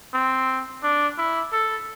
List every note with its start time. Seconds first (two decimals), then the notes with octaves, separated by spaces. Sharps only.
0.14 C4
0.83 D4
1.18 E4
1.53 A4